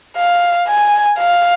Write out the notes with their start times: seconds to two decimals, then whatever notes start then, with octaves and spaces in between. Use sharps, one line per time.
0.17 F5
0.68 G#5
1.19 F5